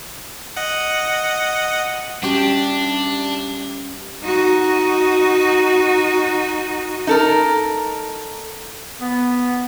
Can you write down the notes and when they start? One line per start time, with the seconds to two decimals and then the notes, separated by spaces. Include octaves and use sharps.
0.57 D#5 F#5
2.23 G3 C#4 D4 G4 G5
4.23 D#4 F#4
7.07 D#4 A4 A#4
9.01 B3